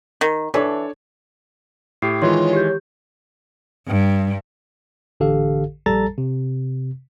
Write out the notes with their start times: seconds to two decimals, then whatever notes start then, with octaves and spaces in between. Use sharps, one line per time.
0.21 D#3
0.54 E3 D4 A4 C#5
2.02 A2 G4 C7
2.22 D#3 E3 G#3 F4 C#5 C6
2.53 G4 G6
3.88 G2
5.20 A1 D3 G4 A4 F5
5.86 A#1 G3 A4 A5 A#5 A6
6.18 C3